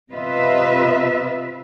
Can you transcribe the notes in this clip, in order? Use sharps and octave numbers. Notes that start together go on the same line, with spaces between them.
C3 F4 B4 D#5 E5